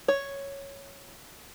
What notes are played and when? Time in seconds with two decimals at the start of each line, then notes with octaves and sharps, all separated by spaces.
0.08 C#5